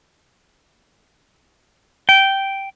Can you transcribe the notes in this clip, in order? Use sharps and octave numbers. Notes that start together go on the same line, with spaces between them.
G5